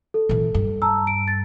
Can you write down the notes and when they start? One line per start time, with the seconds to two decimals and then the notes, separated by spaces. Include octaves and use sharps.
0.14 A4
0.29 A#2 E3
0.55 G2
0.82 A5 A#5 E6
1.07 D7
1.28 A6